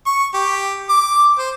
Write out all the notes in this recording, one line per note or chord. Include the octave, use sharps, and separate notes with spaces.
C#6
G4
D6
C5